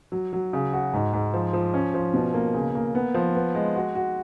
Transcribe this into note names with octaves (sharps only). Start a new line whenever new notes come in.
F#3
F#3
C#3
F#4
G#2
G#2
F3
F3
C#4
F3
B2
A#3
C#3
A#3
B3
F3
B3
G#3
F#4
F#4